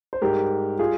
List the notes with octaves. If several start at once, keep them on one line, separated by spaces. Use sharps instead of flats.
C5
G#2 G3 G4 A#4
G3 F4 G#4